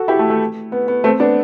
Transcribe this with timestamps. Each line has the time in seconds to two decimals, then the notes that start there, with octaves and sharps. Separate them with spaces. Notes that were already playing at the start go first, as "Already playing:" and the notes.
Already playing: F#4 A4
0.08 E4 G4
0.19 A3
0.30 A3
0.72 B3
0.88 B3
1.04 A3 C4
1.20 B3 D4